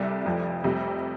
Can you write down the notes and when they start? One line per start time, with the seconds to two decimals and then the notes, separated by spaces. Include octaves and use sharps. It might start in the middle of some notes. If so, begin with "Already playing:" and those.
Already playing: C2 C3 G3 A4 D5
0.25 F1 F2 F3
0.64 F1 F2 C3 G3